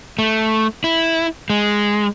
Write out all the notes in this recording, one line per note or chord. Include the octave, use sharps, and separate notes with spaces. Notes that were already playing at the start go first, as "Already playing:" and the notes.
A3
E4
G#3